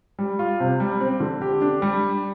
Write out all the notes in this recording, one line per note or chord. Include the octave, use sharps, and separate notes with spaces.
G3
F4
C3
G3
C4
D3
G4
D4
G3